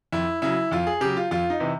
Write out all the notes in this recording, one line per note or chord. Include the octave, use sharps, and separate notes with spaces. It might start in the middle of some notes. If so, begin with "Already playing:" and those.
F2 E4
C#3 F#3 E4
F2 F4
G#4
C#3 F#3 G4
F4
F2 F4
D#4
C3 E3